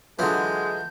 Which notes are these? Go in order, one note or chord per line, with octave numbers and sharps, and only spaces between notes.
D3 E3 F#3 G#3 F4 G#4 G6